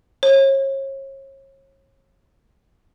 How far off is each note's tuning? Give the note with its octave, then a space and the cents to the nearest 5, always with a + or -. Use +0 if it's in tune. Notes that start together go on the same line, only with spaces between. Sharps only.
C#5 -35